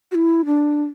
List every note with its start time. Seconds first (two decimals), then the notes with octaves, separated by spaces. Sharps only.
0.11 F#4
0.15 E4
0.46 D4